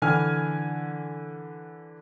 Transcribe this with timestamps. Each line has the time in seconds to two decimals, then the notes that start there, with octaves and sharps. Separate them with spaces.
0.02 D3 E3 G#5 F6